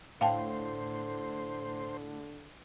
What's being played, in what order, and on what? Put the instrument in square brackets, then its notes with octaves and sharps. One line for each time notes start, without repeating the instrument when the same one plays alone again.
[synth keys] A2 [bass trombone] D3 [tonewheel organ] C5 [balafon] F5 G5 A5